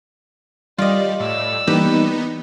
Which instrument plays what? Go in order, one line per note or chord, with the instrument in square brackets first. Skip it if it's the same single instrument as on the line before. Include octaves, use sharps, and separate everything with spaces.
[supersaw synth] G3 [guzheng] F4 D#5 [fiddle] D5
[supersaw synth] A2 [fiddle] D5 E6
[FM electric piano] E3 G3 A#3 [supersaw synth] B3 D#4 [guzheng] G4 B4 A#5